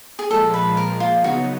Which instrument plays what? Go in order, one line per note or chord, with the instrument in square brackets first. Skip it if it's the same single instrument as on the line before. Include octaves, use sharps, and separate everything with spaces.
[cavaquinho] G#4
[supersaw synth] A#2 F3 G#3 [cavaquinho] A4
[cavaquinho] B4
A#4
F4
[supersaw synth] C#3 F#3 B3 D#4 [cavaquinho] F#4